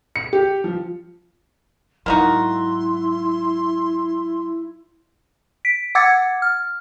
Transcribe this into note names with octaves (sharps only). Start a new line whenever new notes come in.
C#7
G4
F3
G#2 F#3 A#3 D#4 E4 F#4 C6
B6 D7
F#5 D6 E6 G#6 A6 C#7
F6